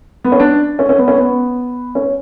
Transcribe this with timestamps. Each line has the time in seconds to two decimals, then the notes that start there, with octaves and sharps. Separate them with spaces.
0.24 B3
0.32 C#4
0.40 D4
0.79 C#4
0.89 C#4
0.98 B3
1.08 C#4
1.18 B3
1.95 C#4